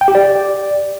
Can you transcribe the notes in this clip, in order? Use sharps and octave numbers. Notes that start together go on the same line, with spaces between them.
G5
G4
D5